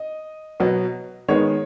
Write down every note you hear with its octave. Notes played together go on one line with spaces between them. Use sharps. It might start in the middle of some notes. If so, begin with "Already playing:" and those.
Already playing: D#5
B2 F#3 B3
D#3 G#3 B3 C#5